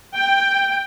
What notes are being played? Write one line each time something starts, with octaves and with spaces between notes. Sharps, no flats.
G5